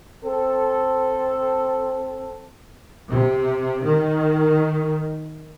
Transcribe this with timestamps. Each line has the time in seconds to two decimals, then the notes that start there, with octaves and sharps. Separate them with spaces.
0.23 C4 A4
3.09 C3
3.83 D#3